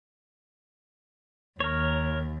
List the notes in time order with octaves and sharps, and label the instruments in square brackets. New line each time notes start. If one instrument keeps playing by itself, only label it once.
[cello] D#2 [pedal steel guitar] A#4 C#5